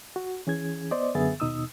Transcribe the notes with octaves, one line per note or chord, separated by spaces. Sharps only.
F#4
E3 C#4 G#4 G#6
B3 C5 D5 D#5
F#2 D3 B3 G#4 E5 A6
D#2 B2 D#4 D#6 E6